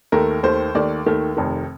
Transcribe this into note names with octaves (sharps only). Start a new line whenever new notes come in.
D#2 D#3 A3 A#4
D#2 D#3 A3 C5
D#2 D#3 A3 D5
D#2 D#3 A3
F1 F2 C3 D#3